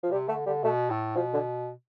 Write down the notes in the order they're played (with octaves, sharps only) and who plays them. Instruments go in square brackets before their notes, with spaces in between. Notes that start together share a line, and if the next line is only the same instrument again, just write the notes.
[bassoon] F3
[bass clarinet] C3 [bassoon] G3
[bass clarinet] D3 [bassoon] A3
[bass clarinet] D3 [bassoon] G3
[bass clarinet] B2 [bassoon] A3
[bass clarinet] A2
[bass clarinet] B2 [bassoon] F3
[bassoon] D3